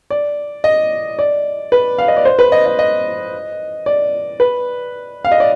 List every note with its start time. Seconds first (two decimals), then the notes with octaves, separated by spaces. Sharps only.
0.10 D5
0.64 D#5
1.19 D5
1.72 B4
1.98 F5
2.08 D#5
2.17 D5
2.25 C5
2.39 B4
2.52 D#5
2.66 D#5
2.79 D#5
3.86 D5
4.40 B4
5.25 F5
5.32 D#5
5.40 D5